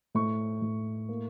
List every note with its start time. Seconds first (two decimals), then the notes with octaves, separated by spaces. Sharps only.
0.15 A2 C#6
0.62 A2
1.09 A#3